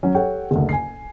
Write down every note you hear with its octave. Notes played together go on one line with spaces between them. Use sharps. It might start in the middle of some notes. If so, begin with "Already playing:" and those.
F#3 C#4
G4 A4 C#5 F#5 G5
F#1 D2
G#5 C7